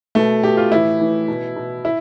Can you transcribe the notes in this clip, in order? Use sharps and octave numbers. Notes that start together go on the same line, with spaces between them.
B2 A3
B2 G4
F4
A2 E3 E4
A2 E3
B2
B2
E4